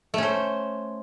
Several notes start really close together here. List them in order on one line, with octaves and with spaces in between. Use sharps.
A3 C#4 C5